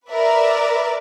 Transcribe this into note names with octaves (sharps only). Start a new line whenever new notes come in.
A#4 B4 D5 E5